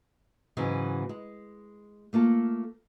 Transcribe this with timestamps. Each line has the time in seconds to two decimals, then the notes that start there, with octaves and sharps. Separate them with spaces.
0.57 G#2 C#3 E3 F#3 G#3
1.09 G#3
2.13 A3 A#3 F4 A4